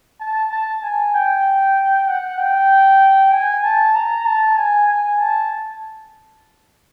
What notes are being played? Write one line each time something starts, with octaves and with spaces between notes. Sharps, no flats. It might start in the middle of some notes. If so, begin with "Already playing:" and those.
A5
A5
G#5
G5
F#5
G5
G#5
A5
A#5
A5
G#5
G#5
A5